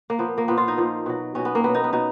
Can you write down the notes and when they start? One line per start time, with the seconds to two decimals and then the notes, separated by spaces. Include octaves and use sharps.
0.10 A#3
0.18 A#2 F3 B3
0.38 A#3
0.48 A#2 F3 B3
0.57 F4
0.68 D#4
0.78 A#2 F3
1.06 B2 F#3
1.35 B2 F#3 C#4
1.45 B3
1.55 A#3
1.64 B2 F#3 B3
1.74 D#4
1.84 B3
1.93 B2 D#4